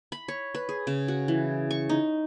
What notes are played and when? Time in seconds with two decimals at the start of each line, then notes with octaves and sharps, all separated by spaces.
0.12 B5
0.28 C#5
0.55 B4
0.69 G#4
0.87 C#3
1.08 F#4
1.28 E3
1.71 C#6
1.89 D#4